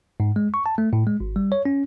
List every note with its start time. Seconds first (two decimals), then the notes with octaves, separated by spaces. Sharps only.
0.20 G#2
0.36 G#3
0.54 C#6
0.66 A5
0.78 A3
0.93 A2
1.07 G#3
1.20 G#1
1.36 G3
1.52 C#5
1.65 C#4